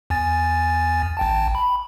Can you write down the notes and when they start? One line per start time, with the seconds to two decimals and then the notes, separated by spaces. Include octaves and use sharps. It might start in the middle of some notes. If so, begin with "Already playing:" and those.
0.10 E2 G#5 A6
1.17 A1 G5 A5
1.55 B5